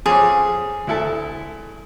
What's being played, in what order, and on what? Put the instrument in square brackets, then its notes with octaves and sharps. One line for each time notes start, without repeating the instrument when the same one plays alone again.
[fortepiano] F2 C#4 D6 [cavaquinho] G#4
[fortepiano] D2 E4 A4